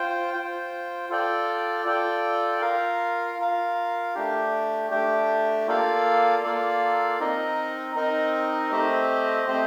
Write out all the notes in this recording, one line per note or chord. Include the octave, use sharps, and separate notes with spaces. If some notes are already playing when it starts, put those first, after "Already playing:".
Already playing: F4 C5 G5
F4 C5 G5
F4 A4 D5 G5
F4 A4 D5 G5
F4 A#4 F5
F4 A#4 F5
A3 D4 G4
A3 D4 G4
A#3 F4 A4 D5 F5
A#3 F4 A4 D5 F5
C4 D#4 A#4 D#5
C4 D#4 A#4 D#5
A3 C4 G4 C5 D#5
A3 C4 G4 C5 D#5